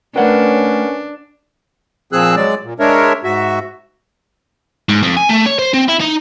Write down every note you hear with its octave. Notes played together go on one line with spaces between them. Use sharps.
A3 C#4 D4 A#4 B4 C#5 F#5 G5
A#2 F3 C4 G#4 E6 F#6
F#3 G#3 D5
A#2
G#3 D4 A#4 C#5 E5
G#2 F#4 E5
G#2
F2
G#5
A3
C#5
C5
C4
E4
D#4